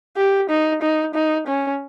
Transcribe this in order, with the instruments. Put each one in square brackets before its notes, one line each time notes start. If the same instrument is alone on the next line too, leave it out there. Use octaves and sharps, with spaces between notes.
[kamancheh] G4
D#4
D#4
D#4
C#4